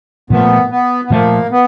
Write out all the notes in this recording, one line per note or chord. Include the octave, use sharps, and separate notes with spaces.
A#2 F3 A3 B3
B3
B3
A#2 F3 A3 A#3
B3